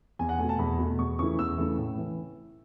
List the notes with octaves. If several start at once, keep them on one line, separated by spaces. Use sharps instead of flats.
E2 G#5
F#5
B2 A3 G#5
A5
E2 B5
B2 A3
E2 C#6
C#3 E3 A3 E4 C#6
E2 E6
C#3 E3 A3 E4
A2
E3